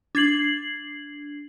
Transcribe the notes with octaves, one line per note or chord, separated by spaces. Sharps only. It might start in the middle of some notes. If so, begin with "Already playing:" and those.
D4 G#6 C7 F#7